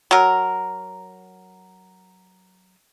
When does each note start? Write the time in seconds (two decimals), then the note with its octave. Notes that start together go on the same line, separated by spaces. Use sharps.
0.11 F#3 A#4